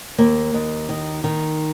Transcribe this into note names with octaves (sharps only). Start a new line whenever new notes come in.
D#2 A#3
D#2
D#3
D#3